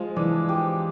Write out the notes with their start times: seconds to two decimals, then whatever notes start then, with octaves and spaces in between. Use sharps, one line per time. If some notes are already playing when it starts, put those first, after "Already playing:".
Already playing: F3 G#3
0.16 E3 D4
0.49 G4